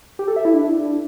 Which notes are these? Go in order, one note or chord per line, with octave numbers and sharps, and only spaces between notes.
G4
A4
E5
E4
D4